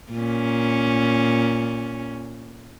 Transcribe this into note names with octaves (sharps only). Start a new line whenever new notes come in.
A#2 C#4